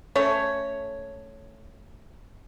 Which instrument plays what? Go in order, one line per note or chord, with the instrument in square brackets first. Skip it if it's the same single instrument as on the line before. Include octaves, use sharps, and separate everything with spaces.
[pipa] A3 C#4 C#5